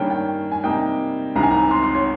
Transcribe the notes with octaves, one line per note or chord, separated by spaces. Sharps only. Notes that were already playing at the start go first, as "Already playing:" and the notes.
Already playing: G2 D#3 A#3 C#4 G5
G5
G#5
C3 G3 A#3 D#4 G5
C2 C3 D#3 A#5
G#5
A#5
C6
C6
C#5